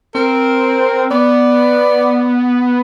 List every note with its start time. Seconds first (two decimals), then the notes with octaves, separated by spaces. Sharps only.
0.15 C4 A#4
1.11 B3 D5